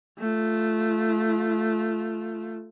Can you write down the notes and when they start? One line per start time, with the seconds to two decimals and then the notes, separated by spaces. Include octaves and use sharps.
0.19 A3 F4